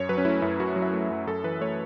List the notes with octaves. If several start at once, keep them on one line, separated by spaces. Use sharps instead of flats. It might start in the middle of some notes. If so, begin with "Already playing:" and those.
Already playing: F#2 C#5
F#3 B4
C#4
A3 E4
F#2 E4
F#2 F#4
F#3
E5
A3
F#2
F#2 A4
E3 B4
A3 C#5